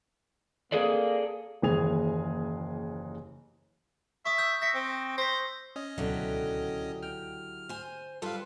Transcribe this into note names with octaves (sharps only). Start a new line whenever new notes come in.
A#3 G#4 A4 D5
F#1 D#2 E3 G#4 G#5 F7
E5 C#6 D#6
E6 G6
E5 A#6 C#7
C4
C5 A#6 B6
C#4 D#5
D1 C#2 B2 D3 F#3 E4 G4
G5 F6
C5 G#5
G3 F4 A4 B4 F5